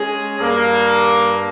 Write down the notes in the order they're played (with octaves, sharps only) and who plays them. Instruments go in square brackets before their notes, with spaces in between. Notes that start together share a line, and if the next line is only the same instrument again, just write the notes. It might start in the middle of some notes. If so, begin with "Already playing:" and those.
Already playing: [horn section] G#3 C#4 G#4
G2 G3 A#3